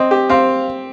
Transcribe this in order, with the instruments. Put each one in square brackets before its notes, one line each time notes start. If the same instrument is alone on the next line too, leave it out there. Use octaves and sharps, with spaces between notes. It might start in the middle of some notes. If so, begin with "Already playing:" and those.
Already playing: [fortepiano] C4 [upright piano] D#5
[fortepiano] G4
[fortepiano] C4 [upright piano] F5